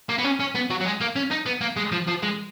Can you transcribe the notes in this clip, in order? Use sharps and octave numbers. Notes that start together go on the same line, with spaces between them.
A#3
B3
C#4
C#4
B3
F#3
F#3
G#3
A#3
C#4
D#4
B3
A#3
G#3
F3
F3
G#3